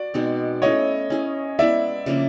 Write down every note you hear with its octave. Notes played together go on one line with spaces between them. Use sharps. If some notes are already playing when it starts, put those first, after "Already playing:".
Already playing: F#4 D5
B2 G#3 C4 D#4
A3 C#4 E4 C#5 D#5
C#4 E4 G#4
G#3 B3 E4 D5 E5
C#3 F3 A#3 D4